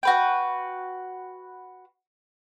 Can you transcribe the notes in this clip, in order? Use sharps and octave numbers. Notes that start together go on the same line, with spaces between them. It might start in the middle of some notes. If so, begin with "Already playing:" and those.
F#4 B4 G5